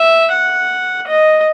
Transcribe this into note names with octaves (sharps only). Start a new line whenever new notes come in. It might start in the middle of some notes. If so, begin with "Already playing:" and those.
Already playing: E5
F#5
D#5